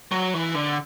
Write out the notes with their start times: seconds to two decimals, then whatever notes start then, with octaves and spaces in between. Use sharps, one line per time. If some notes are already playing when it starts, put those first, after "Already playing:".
0.12 F#3
0.34 E3
0.55 D3